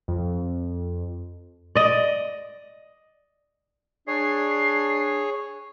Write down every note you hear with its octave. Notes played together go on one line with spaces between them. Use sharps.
F2
D5 D#5
D4 G#4 C#5 C7